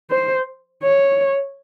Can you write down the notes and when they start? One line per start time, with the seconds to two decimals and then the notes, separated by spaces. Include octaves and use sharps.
0.11 C5
0.83 C#5